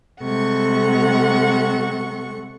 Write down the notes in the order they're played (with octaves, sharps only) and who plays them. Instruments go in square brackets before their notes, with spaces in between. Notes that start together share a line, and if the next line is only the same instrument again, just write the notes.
[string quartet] C3 G3 G#3 A4 F#5 C#6